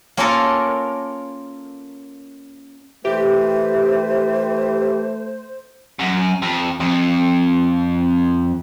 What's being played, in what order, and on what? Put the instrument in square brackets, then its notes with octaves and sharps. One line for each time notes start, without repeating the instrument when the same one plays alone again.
[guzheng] A#3 C#4 F4 A4 A#4
[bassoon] E3 [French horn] A3 [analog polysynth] G4 [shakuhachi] C5
[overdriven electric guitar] F#2
F2
F2